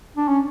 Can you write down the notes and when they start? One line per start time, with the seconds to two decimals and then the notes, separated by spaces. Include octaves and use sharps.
0.17 D4
0.28 C#4